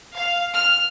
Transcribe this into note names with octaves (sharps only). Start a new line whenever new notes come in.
F5
F6